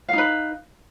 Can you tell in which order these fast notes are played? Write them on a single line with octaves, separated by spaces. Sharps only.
F5 D#4 B4